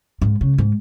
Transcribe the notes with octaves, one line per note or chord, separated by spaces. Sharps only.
G#2
C#3
G#2